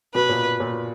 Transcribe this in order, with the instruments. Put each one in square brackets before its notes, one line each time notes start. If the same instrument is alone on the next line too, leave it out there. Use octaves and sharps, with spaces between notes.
[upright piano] B2 [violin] B4
[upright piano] A#2
A#2